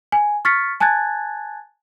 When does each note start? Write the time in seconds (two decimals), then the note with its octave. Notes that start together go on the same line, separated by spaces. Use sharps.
0.12 G#5
0.45 C#6 F6 A6 B6 C#7
0.80 G#5 A5 F#6 G#6 A6